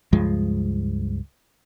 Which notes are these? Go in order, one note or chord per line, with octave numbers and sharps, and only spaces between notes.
C#2 G2 F3 G#3